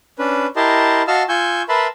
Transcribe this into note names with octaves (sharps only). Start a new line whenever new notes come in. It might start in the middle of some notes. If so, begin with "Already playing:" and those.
C#4 D4 B4
E4 G4 A#4 D#5 A5 C6
F#4 D#5 F5 A5 E6 F6
F4 G#5 C#6 E6 G6
A#4 B4 E5 A5 B5 C6